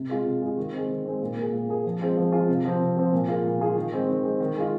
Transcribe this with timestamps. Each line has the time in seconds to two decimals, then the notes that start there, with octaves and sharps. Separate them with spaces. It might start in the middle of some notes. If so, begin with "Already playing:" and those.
Already playing: C3
0.09 G#3 F4 G#4
0.25 C3
0.42 G#3 F4 G#4
0.57 D#3
0.73 G#3 C4
0.89 D#3
1.05 G#3 C4
1.22 A#2
1.36 A#3 G#4
1.52 A#2
1.69 A#3 G#4
1.85 F3
2.01 G#3 C4 F4 G#4
2.17 F3
2.32 G#3 C4 F4 G#4
2.48 C3
2.65 F3 C4
2.80 C3
2.97 F3 C4
3.13 A#2
3.28 A#3 F4 G#4
3.44 A#2
3.60 A#3 F4 G#4
3.76 D#3
3.93 G#3 C4
4.08 D#3
4.24 G#3 C4
4.40 D#3
4.56 G#3 F4